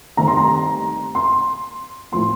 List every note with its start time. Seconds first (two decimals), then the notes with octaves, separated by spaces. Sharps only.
0.17 G2 D#3 A3 C4 A#5
0.27 C6
0.37 A#5
1.15 C6
2.12 A2 F3 C4 C6